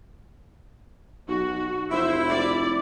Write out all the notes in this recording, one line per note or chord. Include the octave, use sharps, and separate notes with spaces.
B1 F#4
F1 E4 C5 E5
D5